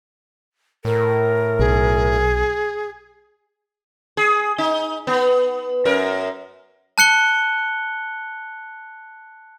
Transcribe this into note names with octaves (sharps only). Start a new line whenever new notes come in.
A2 A#4
B1 G#4
G#4
D#4
B3
F#2 A#4
A5 F#6 C#7 G7